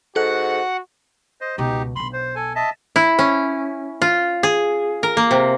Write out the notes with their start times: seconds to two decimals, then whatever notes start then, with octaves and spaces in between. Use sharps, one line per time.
0.16 G#2 F#4 A4 F#5 F#6
1.41 C5 D#5
1.58 C#2 B2 D#4 G4
1.96 B1 D4 B5 C6
2.13 C5
2.35 A4 G#5
2.55 D#5 E5 A5
2.96 E4
3.19 C#4
4.02 F4
4.43 G#4
5.03 A#4
5.17 A#3
5.31 C3